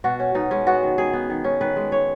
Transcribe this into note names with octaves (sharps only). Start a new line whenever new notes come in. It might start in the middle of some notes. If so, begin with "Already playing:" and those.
B2 F#4
C#4
B2 D#4
G#3 C#4
B3 F#4
D#3
D#3 G#4
B3
D#3
C#4
D#3 B4
G#3
C#5